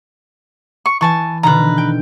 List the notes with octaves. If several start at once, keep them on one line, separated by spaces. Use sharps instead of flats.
C#6
E3 G#5 A5 C#6
B2 D3 D#3 B4 A#5
G5